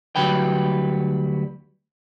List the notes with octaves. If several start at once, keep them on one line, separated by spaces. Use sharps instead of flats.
D2 F#3 G3 B4 G5